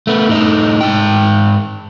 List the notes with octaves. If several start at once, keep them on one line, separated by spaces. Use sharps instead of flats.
A3 B3
A2 D#4
G#2 G5